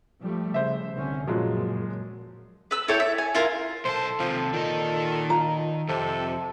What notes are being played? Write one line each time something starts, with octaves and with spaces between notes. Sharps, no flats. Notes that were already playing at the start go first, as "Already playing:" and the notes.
F3 G3 A3
C#3 C5 E5
C2 D3 C#4
F#2 A#2 C#3 F3 F#3 G#3
B4 E6
E4 A4 C#5 G5
E5
G#5
E4 F4 A#4
B1 A4 C5 A5
D#2 C3 F3
A#2 D#3 D#5
F4 A#5
F2 C3 A4